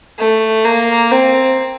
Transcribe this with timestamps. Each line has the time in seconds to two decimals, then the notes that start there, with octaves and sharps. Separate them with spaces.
0.19 A3
0.65 A#3
1.11 C4